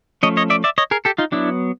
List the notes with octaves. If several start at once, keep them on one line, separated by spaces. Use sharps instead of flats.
F3 A3 C#4 C#5 D#5
C#5 D#5
D5 E5
D5 E5
C#5 D#5
G#4 A#4
G4 A4
D#4 F4
F#3 B3 D4 E4